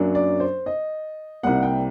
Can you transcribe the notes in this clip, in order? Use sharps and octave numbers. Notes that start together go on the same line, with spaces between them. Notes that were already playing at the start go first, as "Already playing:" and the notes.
Already playing: F#2 F#3 A#3 D4
D5
C5
D#5
C2 C3 G3 A#3 F#5
G5